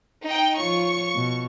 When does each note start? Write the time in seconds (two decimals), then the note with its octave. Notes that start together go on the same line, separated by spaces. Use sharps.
0.24 D#4 G5
0.58 F3 F4 C#5 C#6
1.15 B2